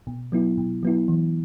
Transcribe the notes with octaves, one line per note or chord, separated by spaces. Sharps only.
B2
F#3 B3 E4
B2
F#3 B3 E4
E3